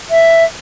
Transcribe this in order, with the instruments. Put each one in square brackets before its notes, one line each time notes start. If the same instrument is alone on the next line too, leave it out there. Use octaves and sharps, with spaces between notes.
[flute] E5